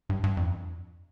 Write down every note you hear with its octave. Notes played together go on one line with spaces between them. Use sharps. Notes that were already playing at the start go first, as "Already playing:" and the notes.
G2
G2
F2